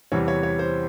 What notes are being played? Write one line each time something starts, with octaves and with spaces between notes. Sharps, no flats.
E2 C3 E3 G3 C#5
C#5
C#5
C5